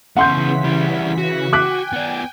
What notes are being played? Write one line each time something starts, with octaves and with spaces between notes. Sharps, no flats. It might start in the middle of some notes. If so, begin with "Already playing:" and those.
C#3 E3 B3 C#4 F#5 C6 G6 B6
G3 E4
F#4
G5 G#5 D6 F#6 B6
B3 D5